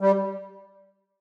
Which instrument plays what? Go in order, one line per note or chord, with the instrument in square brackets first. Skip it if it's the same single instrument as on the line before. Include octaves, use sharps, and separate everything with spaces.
[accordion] G3